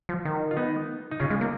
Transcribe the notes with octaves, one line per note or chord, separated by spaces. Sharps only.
F3
D#3
F4
B3 D#4
D#4
C#3 C#4 F4
G#3
A#3